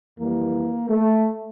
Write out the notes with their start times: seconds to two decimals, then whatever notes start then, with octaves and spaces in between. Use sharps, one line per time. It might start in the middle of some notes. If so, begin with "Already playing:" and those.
0.18 F2 E3 G3 A#3
0.89 A3